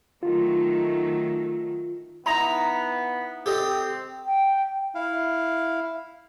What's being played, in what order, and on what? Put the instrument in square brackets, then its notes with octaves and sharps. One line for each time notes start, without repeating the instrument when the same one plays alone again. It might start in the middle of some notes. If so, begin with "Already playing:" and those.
[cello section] D#3 F#3 A3 [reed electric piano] F4
[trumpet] B3 [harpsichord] D#4 E4 [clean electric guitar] A#5
[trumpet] C4 [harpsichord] G4 A4 D#5
[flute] G5
[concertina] E4 F5